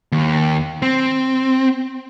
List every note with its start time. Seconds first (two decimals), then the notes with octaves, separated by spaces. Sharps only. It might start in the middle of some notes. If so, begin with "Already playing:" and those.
0.12 D#2
0.82 C4